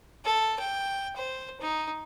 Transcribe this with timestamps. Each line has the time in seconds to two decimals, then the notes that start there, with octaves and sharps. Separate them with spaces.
0.25 A4
0.59 G5
1.16 C5
1.61 D#4